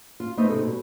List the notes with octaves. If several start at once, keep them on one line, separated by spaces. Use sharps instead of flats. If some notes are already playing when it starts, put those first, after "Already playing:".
F4
A3 B3 D#4 C5 D#5 E5
C3 C4 D#4 A4
B2 G3